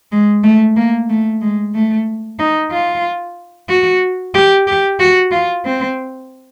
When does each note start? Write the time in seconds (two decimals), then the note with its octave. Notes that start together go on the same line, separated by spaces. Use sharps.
0.12 G#3
0.43 A3
0.76 A#3
1.10 A3
1.41 G#3
1.75 A3
2.39 D#4
2.72 F4
3.69 F#4
4.34 G4
4.67 G4
5.00 F#4
5.31 F4
5.65 C4